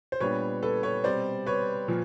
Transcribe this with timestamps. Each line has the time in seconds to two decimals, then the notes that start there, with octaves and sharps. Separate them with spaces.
0.12 C5
0.20 A#2 G3 B3 D4 B4 C#5
0.63 A4 B4
0.83 B4 C#5
1.04 B2 G3 C4 C5 D5
1.46 B4 C#5
1.88 A#2 F3